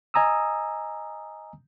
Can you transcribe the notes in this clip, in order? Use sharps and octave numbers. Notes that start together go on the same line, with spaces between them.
D#5 G#5 A#5 D#6 E6